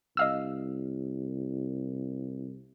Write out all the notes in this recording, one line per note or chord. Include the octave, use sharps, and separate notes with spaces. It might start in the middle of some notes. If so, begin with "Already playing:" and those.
C2 D#5 F5 E6